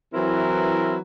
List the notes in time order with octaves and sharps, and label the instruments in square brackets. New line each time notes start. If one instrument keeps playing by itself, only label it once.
[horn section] E3 F#3 C4 E4 A#4 B4